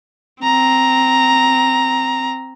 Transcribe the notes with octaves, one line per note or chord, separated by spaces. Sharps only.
C4 A#5